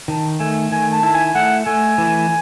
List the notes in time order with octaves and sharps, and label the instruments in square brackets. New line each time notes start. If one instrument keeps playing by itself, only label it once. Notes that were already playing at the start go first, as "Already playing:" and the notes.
[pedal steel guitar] D#3 [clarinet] A5
[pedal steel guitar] A3 [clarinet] G#5
[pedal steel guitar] D#3 [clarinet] G#5
[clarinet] A5
[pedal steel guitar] E4 [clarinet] A5
[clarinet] G#5
[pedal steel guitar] A3 [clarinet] F#5
[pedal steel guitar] A3 [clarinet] G#5
[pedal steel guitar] E3